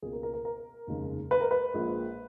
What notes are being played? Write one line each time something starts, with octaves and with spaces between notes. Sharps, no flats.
C#2 B2 A#3 G#4
A#4
A#4
A#4
A#4
F1 D#2 C#3 G#3
B4
A#4
B4
A#1 A#2 G#3